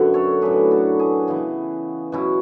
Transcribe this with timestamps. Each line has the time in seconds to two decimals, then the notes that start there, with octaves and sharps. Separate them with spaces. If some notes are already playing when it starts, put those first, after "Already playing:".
Already playing: F#2 D3 F#3 B3 E5 F#5
0.14 A4 C#5
0.42 A2 F#3 B3 D4 G#4 B4
0.71 F#4 A4
0.99 G#4
1.27 C#3 E3 B3 G#4
2.12 B2 F#3 C#4 E4